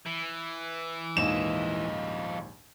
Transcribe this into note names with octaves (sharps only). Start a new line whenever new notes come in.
E3
A#1 D#2 G#2 F3 D#5 E7